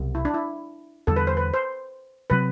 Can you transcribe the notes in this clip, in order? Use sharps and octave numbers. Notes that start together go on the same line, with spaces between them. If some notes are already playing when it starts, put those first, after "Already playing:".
Already playing: C2 B2 F#3
E4
D4
E4
E2 D3 G3 A4
B4
C5
B4
C5
C3 F#3 C4 B4